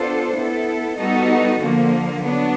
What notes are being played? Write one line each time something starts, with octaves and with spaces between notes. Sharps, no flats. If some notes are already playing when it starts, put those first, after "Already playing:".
Already playing: B3 D4 F4 A4 C5
B3 E4 A4
G3 B3 D#4 F#4 A4
D3 F3 A#3
F#3 B3 D4